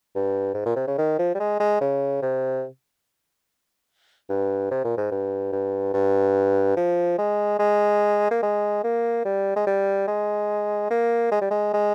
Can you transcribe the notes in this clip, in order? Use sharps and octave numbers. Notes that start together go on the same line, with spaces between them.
G2
G#2
A#2
C3
C#3
D#3
F3
G3
G#3
G#3
C#3
C3
G2
C3
A#2
G#2
G2
G2
G2
F3
G#3
G#3
A#3
G#3
A#3
G3
G#3
G3
G#3
A#3
G#3
G3
G#3
G#3